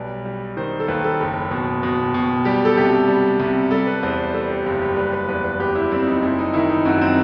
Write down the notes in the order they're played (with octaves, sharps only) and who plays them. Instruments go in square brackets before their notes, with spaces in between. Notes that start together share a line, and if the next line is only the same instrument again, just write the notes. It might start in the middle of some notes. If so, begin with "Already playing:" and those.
Already playing: [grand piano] B1 G3 B4
G3
D#3 C5
A4
D#2 B4
A4
F#1
B2
B2
B2
G3 G4
A4
C2 G4
G3
C2
G3 A4
B4
E2 C5
G3 A4
G4
F#1 G4
G4
G3 B4
B4
E2 B4
B4
E2 G4
E4
G3 C4
D#4
F#1 E4
D#4
D#3 E4
D#4
F#2 F#4
C4